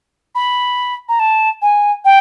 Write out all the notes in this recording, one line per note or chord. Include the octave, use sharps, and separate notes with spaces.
B5
A#5
A5
G#5
G5